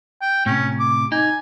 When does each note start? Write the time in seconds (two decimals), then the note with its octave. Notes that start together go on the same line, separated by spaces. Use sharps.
0.21 G5
0.46 A2 C3 C#4
0.80 D6
1.12 D#4 G#5